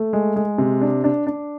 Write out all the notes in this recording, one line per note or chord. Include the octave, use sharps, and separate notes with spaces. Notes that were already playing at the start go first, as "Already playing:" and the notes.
Already playing: A3
G#3
G#3
C3
D4
D4
D4